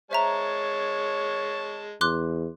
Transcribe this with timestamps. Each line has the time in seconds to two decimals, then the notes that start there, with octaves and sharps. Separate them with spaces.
0.11 G#3 C5 C#5 E5 A5 A#5
2.01 E2 C6 D6 F#6